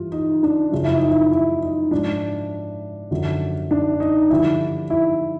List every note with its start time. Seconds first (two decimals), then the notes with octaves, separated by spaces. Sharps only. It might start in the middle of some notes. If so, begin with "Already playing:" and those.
Already playing: G2 E3 F4
0.12 D#4
0.43 D4
0.72 F#2 C#3 F3 F4
0.84 E4
0.96 D#4
1.09 E4
1.32 E4
1.62 D#4
1.91 G#2 F3 D4
3.11 F#2 D3 F3
3.71 D4
4.00 D#4
4.30 G2 D3 F3 E4
4.90 E4